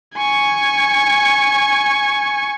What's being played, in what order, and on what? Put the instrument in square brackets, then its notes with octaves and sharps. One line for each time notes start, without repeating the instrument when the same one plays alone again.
[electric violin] G#5 C#6